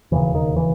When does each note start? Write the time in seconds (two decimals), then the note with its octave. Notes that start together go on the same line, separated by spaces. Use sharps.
0.11 E1 D#2 C#3 E3
0.35 D#3
0.56 E3